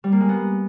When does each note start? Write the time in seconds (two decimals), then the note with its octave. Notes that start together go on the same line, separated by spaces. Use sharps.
0.04 G3
0.12 A#3
0.21 G#3
0.29 B3